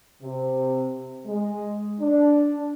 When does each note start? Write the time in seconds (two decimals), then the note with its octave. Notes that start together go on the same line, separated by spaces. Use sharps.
0.22 C3
1.26 G#3
2.00 D4